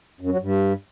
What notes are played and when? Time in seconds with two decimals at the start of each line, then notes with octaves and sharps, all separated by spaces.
0.21 F#2
0.31 F#3
0.41 G2